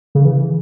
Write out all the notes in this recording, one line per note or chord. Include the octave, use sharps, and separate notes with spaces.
C#3
E3